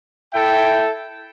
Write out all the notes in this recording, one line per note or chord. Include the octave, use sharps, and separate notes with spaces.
E4 A4 E5 G5